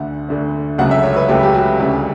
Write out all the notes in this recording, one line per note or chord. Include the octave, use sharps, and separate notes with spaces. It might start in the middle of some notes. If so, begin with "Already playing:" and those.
Already playing: D2 D3 A3 F#5
D2 D3 A3
C#2 C#3 F#3 A3 F#5
E5
C#5
B4
C#2 C#3 F#3 A3 G4
G4
F#4
D2 C#3 G3 E4